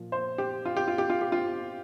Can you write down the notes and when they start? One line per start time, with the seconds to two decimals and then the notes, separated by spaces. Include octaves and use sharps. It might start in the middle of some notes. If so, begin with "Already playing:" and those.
Already playing: A#2 F3
0.12 C5
0.38 G4
0.65 F4
0.77 G4
0.88 F4
0.98 G4
1.10 F4
1.21 G4
1.32 F4